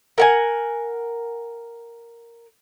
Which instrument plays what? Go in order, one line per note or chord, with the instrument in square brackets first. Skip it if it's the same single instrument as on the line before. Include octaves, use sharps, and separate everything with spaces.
[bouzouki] A#4 F#5 G#5